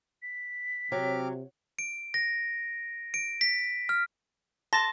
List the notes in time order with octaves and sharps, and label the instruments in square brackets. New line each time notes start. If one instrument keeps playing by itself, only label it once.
[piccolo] B6
[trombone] C3 [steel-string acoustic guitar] F#3 [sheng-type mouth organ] C4 D6 F6
[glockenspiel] D7
A#6
D7
B6
F6
[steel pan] A5 [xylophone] C6 A#6